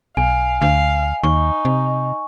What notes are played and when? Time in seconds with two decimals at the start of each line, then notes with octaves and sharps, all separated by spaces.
0.17 B1 F5 G#5
0.62 D2 F5
1.23 D#2 D#4 C#6
1.65 C3